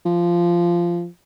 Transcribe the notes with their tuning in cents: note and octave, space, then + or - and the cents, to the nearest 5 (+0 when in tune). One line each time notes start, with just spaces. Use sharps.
F3 -15